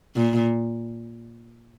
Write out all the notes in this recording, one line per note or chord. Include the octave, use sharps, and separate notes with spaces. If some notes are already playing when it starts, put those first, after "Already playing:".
A#2